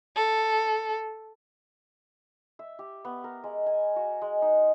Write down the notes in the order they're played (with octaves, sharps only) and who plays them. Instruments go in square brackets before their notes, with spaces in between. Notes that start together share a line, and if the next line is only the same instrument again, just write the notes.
[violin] A4
[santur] E5
G4
B3
A#4
G#3
G#5
F#4
G#3
D#4